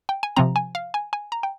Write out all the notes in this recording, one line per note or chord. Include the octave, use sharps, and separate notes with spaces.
G5
G#5
C3 F3 C4 A#5
G#5
F5
G#5
G#5
A#5
G5